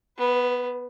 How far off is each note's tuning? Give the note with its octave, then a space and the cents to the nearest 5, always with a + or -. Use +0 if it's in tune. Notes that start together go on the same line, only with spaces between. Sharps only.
B3 +0 B4 +45